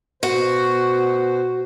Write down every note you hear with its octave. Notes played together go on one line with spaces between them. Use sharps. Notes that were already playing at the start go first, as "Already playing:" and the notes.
B2 F#4 C5